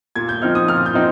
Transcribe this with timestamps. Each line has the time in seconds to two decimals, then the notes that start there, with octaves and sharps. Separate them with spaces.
0.16 A#2 G#6
0.29 G6
0.42 F3 C4 D#4 F6
0.55 D#6
0.68 A#2 F6
0.86 G6
0.94 F3 C4 D#4